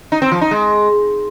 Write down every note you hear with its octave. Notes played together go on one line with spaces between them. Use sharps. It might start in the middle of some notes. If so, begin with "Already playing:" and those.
D#4
C4
F3
D#4
G#3